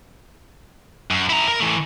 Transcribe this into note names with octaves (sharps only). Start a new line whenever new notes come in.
F#2
E4 A#5
A#4
E3 A3